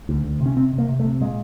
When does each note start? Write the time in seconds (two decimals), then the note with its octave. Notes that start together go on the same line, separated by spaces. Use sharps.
0.09 D2
0.24 D2
0.40 C3
0.46 C#4
0.57 C3 C4
0.73 C3
0.78 A#3
0.89 C3
1.00 A3
1.06 C3
1.21 A#2 G#3